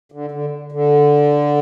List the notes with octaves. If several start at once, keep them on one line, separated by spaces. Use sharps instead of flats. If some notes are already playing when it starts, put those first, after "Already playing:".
D3
D3
D3